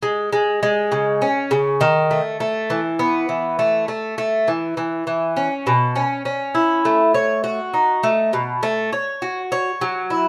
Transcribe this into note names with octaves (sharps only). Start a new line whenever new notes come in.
G#3
G#3
G#3
C#3
C#4
C#3
D#3
A3
A3
E3
B3
E3
A3
A3
A3
E3
E3
E3
C#4
B2
C#4
C#4
E4
A3
C#5
F#4
D#4
A3
B2
A3
C#5
F#4
C#5
F#3
E4